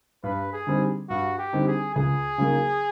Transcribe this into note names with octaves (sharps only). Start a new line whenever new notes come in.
G2 B4
G#4
D3 G3 C4 D#4
G2 F#4
G4
D3 G3 C4 D#4
G#4
C#2 G#4
C#3 F#3 A#3 D#4